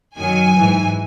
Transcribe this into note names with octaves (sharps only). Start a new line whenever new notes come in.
F#2 D#3 F#3 G#5
G#2 E3